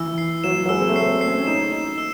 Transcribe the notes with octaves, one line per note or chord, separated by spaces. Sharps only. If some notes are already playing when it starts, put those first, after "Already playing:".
Already playing: E3 E6
C7
F#3 E7
F#3
G#3 E6
C4
A3
C7
C4
C7
C#4
D#4 E7
D#4 E7
E6